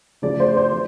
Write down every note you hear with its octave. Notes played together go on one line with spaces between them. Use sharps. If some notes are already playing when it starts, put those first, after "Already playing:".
C#3 F3 A3 D5
C5
C5
F3